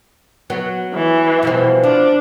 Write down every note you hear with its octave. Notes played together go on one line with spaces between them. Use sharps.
F#3 B3
E3
B2 F3 G3
F3 D4